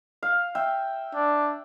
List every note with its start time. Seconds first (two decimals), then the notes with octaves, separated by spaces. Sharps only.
0.23 F5
0.55 E5 G5
1.15 D4